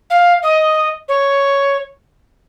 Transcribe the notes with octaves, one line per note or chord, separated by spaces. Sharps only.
F5
D#5
C#5